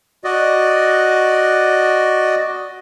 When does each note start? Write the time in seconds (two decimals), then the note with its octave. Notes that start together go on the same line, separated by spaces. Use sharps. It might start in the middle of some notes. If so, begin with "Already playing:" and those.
0.24 F#4 D5 D#5